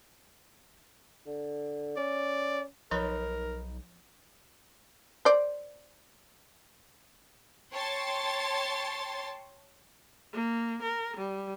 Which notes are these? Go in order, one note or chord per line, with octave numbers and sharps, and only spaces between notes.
D3
C#4 D5
B1 F3 D#4 A#4 B4 C#5
C5 D5
C#5 G5 A5 C6 A6
A#3
A#4
G3